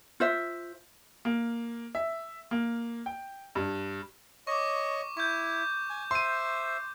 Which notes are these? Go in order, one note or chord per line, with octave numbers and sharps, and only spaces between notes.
F4 C5 E5
A#3
E5
A#3
G5
G2
C#5 D#5 C#6 D6
E4 C#6 G6
G#5
C5 E5 C6 D#7